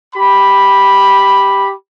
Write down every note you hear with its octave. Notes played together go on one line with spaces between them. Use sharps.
G4 B5